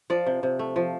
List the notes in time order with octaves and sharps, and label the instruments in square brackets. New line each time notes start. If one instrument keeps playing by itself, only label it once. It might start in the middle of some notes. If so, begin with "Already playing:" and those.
[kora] F3 D5
C3
C3
A3
F3